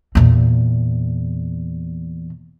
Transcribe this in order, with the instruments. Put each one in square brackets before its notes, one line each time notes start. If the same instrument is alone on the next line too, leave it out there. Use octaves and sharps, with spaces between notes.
[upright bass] E2 A#2